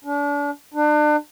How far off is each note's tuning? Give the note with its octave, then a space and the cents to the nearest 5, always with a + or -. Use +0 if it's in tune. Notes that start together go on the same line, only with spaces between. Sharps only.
D4 -35
D4 +35